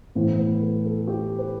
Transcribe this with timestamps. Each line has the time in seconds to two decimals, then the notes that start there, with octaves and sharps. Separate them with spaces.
0.15 A2 E3 B3 C5
0.38 B4
0.62 A4
0.85 A4
1.08 G4
1.39 B4